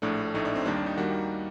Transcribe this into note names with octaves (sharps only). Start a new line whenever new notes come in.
A#1 A2 A3 D4
A#1 A2 A3 D#4
D4
C4
D#2 D#3 G3 A#3 D4
D4
D#4
D#3 G3 A#3 F#4